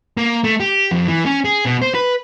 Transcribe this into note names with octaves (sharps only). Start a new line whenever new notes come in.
A#3
A3
G4
F2
E3
C#4
G#4
B2
C5
B4